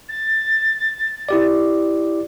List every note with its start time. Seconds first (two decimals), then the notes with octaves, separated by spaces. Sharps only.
0.09 A6
1.29 E4 G4 D5